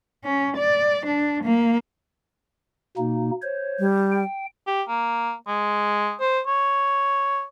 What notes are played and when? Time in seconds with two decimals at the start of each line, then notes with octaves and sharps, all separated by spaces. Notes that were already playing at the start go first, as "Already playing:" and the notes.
0.24 C#4
0.57 D5
1.06 D4
1.44 A#3
2.97 B2 A#3 D#4
3.42 C5 C#5
3.79 G3
4.12 G5
4.67 G4
4.89 A#3
5.48 G#3
6.21 C5
6.47 C#5